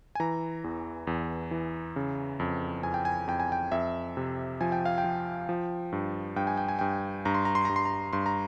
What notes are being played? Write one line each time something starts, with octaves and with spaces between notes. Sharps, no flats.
G#5
E3 A#5
E2
E2
E3
C#3
F2
F2 G#5
G5
G#5
F2 G5
G#5
G5
F2 E5
C3
F3 G#5
G5
F5
G5
F3
F3
G2
G2 G5
G#5
G5
G#5
G2 G5
G2 A#5
C6
A#5
C6
G2 A#5
C6
A#5
G2 C6
A#5